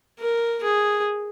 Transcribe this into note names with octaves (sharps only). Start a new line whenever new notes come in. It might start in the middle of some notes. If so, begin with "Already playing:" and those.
A#4
G#4